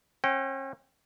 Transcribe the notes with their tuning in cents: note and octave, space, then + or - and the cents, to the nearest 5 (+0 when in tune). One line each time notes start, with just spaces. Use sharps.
C#4 -45 G5 -30